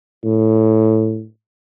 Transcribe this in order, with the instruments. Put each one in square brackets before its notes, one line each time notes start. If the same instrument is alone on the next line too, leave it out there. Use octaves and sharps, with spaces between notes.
[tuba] A2